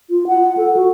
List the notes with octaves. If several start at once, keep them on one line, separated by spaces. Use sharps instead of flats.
F4
F#5
A4
F#4